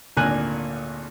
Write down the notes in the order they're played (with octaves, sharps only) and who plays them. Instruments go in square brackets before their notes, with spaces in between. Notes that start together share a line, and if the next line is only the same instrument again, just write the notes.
[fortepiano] G#1 D2 A#2 A#3 G#5 F#6